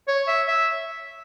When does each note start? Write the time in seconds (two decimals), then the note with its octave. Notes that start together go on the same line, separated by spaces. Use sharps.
0.08 C#5
0.28 E5
0.48 E5